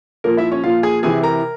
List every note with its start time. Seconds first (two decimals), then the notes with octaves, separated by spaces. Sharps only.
0.24 A#2 F3 A#3 A#4
0.37 E4 E5
0.52 C#4 C#5
0.64 A#2 F3 F4 F5
0.83 G#4 G#5
1.03 C3 E3 G#4 G#5
1.23 A#4 A#5